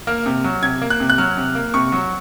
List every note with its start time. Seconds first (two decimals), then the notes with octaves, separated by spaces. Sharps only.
0.07 A#3 F6
0.26 C3
0.44 F#3
0.63 C3 G#6
0.82 A#3
0.90 F#6
1.00 C3
1.10 F#6
1.18 F#3 F6
1.37 C3
1.55 A#3
1.74 C3 C#6
1.92 F#3